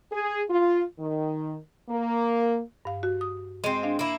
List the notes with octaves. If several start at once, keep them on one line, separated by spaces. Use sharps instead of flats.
G#4
F4
D#3
A#3
G2 F5
F#4
D#6
G#3 C4
D4 F5
A#3 E4